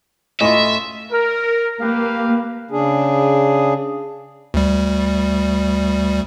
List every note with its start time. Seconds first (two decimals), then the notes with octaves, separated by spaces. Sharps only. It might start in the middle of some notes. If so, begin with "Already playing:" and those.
0.41 A2 C#4 F4 D#5 E5
1.11 A#4
1.81 A#3 G4 B4 F5
2.71 C#3 D4 G#4
4.54 D2 G3